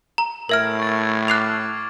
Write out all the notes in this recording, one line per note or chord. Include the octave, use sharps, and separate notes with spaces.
A#5
A2 A#4 E5 E6 F6 G#6 D7
C#6 A6
D6 F6 F#6 C7 F7